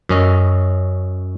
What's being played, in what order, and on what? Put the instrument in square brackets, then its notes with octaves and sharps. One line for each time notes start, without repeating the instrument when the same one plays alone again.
[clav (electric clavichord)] F#2 C#4 D#5